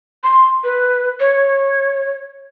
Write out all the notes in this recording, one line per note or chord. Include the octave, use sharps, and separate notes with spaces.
C6
B4
C#5